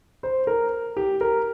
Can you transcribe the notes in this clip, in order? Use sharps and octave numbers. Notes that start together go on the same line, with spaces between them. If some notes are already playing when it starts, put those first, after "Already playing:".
C5
A#4
G4
A#4